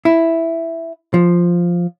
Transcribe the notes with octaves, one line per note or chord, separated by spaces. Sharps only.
E4
F3